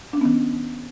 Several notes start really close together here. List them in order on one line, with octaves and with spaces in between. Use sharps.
D4 C#4 B3 D#3